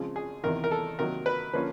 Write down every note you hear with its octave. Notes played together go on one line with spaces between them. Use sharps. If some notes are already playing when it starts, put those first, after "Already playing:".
Already playing: C#3 F3 G#3 C4
G#4
E2 C3 D#3 A#4
A#4
A4
C3 D#3 F#3 A#3 A#4
B4
D3 F3 A#3 C#4 B4